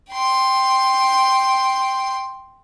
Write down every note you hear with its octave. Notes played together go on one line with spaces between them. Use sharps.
G5 C6